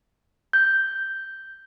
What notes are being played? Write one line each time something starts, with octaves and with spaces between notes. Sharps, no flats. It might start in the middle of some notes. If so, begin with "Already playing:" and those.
G6